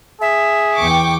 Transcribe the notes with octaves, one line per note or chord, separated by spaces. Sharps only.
G#4 E5
E2 G5 C#6 D6